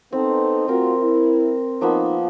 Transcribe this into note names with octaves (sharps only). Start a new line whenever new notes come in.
B3 C4 D#4 A4
A3 C4 F4 F#4 A#4
E4
F3 A#3 B3 D#4